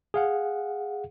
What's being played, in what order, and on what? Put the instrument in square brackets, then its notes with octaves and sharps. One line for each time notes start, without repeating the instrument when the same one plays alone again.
[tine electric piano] G#4 F5 F#5